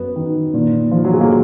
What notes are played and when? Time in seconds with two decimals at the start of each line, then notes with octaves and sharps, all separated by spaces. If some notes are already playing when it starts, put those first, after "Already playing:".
Already playing: F#2 B3
0.16 D#3
0.54 A#2
0.91 F3
1.05 F#3
1.13 G#3
1.21 A#3